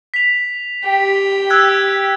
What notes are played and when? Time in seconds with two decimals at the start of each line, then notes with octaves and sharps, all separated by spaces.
0.14 B6 F7
0.85 G4
1.50 E6 F#6 G#6